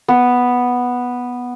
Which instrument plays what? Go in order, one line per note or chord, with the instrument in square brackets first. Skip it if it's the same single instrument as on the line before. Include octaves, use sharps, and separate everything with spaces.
[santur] B3